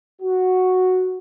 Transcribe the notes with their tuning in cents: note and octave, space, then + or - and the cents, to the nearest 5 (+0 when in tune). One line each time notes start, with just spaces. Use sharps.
F#4 -5